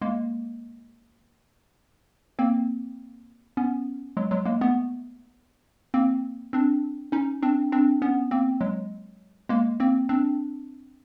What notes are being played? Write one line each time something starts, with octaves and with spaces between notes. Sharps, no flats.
G#3 A#3
A#3 C4
B3 C#4
F#3 G#3
F#3 G#3
G#3 A#3
A3 B3
A#3 C4
C4 D4
C#4 D#4
C4 D4
C4 D4
B3 C#4
A#3 C4
F#3 G#3
G#3 A#3
A#3 C4
C4 D4